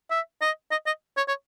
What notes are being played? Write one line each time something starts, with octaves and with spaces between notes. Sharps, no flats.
E5
D#5
D#5
D#5
C#5
C#5